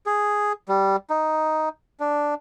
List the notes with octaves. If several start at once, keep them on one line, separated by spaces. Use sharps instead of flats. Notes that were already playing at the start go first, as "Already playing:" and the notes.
G#4
G3
D#4
D4